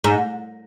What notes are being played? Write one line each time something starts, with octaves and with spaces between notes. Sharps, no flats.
G#2